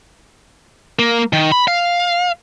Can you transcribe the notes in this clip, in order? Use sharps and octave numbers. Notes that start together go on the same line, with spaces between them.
A#3
D#3
B5
F5